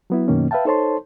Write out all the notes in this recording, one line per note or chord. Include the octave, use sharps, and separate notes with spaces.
F#3 B3 E4
F#2 B2 D#3 A#3 C#4
B4 E5 F5 G5 A5
D#4 A4 C5 C#5 A5 C6